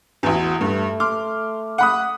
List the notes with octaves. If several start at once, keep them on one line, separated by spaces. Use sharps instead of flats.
A1 E2 F#4
G2 A3
C6 D6 F6
F#5 B5 D#6